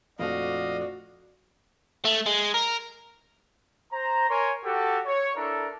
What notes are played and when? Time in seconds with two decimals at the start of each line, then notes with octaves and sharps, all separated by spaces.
0.19 A#1 F2 A3 F#4 D5 D#5 F5
2.05 A3
2.26 G#3
2.54 A#4
3.92 C5 A#5
4.29 A#4 C#5 G#5 A#5 C6
4.64 F#4 G4 A4
5.06 C#5
5.36 D4 E4 A4 A#4